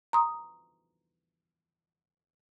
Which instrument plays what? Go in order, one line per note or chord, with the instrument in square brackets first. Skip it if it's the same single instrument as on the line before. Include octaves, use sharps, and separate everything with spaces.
[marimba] A#5 C6 D#6